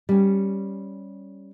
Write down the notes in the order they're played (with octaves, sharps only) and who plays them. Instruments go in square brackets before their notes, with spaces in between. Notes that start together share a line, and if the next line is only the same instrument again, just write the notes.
[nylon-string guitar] G3 C#4